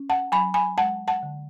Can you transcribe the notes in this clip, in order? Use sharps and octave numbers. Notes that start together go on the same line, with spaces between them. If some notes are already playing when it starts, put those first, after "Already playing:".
Already playing: C#4
F#5 A5
F#3 G#5 B5
G#5 B5
G#3 F#5 A5
F#5 A5
D3